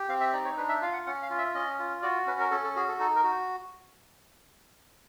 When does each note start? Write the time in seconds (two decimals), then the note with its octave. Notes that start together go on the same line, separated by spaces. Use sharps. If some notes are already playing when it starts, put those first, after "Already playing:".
Already playing: G4
0.09 C4 F5
0.20 E5
0.33 D#4 D5
0.45 C#5
0.57 D4 B4
0.69 E5
0.82 F4 F5
0.93 F#5
1.06 C#4 F#5
1.22 F5
1.30 F4
1.38 E5
1.54 C#4 D#5
1.79 F4
2.02 F#4 D5
2.26 C#4 B4
2.40 A#4
2.51 C#4 A4
2.64 A4
2.76 F#4 G#4
2.88 A4
2.99 D#4 A4
3.16 A#4
3.24 F#4